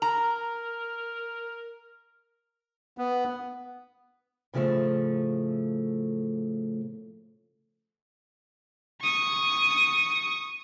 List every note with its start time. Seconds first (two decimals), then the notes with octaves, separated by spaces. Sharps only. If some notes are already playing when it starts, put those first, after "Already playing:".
0.02 A#4 A#5
2.98 B3
4.54 A2 C#3 F3 G3 A3
9.02 C#6 D#6